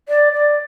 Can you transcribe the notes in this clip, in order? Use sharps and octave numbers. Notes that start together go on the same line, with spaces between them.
D5
D5